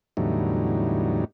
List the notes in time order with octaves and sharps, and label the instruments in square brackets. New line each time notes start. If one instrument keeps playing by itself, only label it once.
[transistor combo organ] E2 A2 D3 F#3 G3 D#4